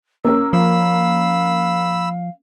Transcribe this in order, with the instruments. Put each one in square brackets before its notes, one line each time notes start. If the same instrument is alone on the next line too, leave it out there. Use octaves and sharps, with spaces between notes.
[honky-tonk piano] A#3 C#4 A#4 [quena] E6
[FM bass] F3 [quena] F5 [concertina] B5 E6